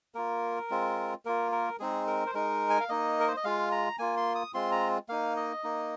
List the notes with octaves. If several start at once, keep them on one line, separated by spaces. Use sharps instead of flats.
A#3 F4 A#4
G#3 C4 F4
A#3 F4 A#4
A#4
G#3 C4 D#4 G#4
A#4
C5
G#3 D#4 A#4
G#5
F5
A#3 D#4 D#5
A#4
C5
D#5
G#3 F4 F5
A#5
A#3 F4 G#5
C6
D#6
G#3 C4 F4 C6
A#5
A#3 D#4 F5
D#5
A#3 D#4